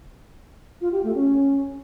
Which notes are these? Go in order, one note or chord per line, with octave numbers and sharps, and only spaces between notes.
F4
G4
A3
C#4